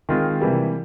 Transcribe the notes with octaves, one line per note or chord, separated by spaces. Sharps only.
D#3 G#3 C4 F4
C3 E3 G3 A#3